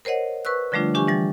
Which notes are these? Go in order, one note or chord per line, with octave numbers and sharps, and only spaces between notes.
A#4 C5 C#5 D#5 F#5
B4 C#6 E6 F#6
D3 F3 G3 A3 D4 F4
E3 D4 G4 G#5 C#6
E3 G3 A6